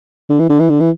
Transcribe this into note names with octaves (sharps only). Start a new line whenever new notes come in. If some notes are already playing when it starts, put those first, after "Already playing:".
D3
E3
D3
E3
D3
E3